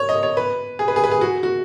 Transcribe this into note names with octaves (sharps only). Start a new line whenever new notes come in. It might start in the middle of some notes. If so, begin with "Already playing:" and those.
Already playing: C#5
D#5
C#5
B4
G#4
B4
G#4
B4
G#4
F#4
F#4